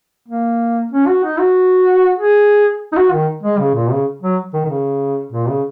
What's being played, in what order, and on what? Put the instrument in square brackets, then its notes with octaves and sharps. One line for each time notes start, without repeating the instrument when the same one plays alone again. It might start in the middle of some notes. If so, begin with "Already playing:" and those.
[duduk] A#3
C#4
F#4
D#4
F#4
G#4
D#4
F#4
D#3
G#3
C#3
A#2
C#3
F#3
D#3
D#3
C#3
A#2
C#3